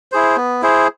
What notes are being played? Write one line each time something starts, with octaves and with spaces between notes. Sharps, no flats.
E4 G#4 C5
B3
E4 G#4 C5